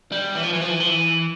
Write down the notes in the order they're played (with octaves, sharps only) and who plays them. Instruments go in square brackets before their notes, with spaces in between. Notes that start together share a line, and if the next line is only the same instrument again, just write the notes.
[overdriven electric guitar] G3
E3
F3
E3
F3
E3
F3
E3